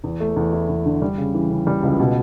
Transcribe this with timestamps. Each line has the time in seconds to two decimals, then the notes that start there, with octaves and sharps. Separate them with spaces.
0.04 E2
0.20 A3
0.36 E2
0.53 E4
0.69 E2
0.85 D3
1.02 G3
1.18 C#3
1.34 E3
1.51 C#3
1.67 G3
1.83 C#2
1.99 B2